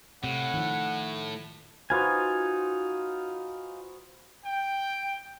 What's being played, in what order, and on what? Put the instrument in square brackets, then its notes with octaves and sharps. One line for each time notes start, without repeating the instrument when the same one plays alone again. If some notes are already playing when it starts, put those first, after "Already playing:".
[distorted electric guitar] A2 [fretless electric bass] C3 [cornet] F#5
[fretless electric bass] D#3 F3
[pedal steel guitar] D#4 F4 G#5 [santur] F#4 B4 C5
[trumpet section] G5